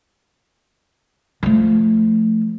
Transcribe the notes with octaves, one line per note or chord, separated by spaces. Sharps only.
F3 A3